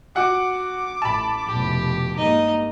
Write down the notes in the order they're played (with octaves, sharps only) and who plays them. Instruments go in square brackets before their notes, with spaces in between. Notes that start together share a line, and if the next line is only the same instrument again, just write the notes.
[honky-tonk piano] F#4 F#5 [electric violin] D6
[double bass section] A1 [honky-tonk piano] A5 B5
[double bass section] F1 B2 [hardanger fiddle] G4
[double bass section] G2 G#3 A#3 [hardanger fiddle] D#4 D#5